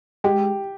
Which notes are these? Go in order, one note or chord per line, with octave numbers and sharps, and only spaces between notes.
G#3 G4